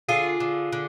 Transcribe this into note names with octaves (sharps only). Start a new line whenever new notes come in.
D3 F4 G#4
D3
D3